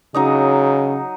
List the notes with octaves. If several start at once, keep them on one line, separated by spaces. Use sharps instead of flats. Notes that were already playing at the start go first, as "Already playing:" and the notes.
C#3 F#3 D#4 D#5